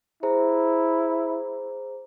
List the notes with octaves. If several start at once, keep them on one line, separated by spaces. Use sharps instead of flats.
E4 G#4 C5 A#5